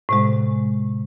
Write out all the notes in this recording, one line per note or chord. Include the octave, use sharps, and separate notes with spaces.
A2 C3 G#3